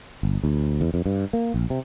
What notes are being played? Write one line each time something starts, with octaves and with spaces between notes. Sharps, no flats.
G1
D2
E2
F2
G2
A#3
A#1
C3